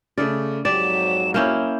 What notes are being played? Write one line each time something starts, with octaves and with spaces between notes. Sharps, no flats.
C#3 A3 D5
F2 G#2 F#3 G4 D5 E7
A#3 C#4 E4 F6 G6 E7